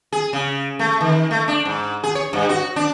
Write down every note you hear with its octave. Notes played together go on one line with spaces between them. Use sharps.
G#4
C#3
A3
D#3
A3
D4
G#2
G#4
C#5
G2
F#4
D4